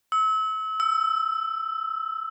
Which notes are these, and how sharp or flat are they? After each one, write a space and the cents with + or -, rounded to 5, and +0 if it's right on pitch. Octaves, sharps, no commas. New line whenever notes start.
E6 -35
E6 +10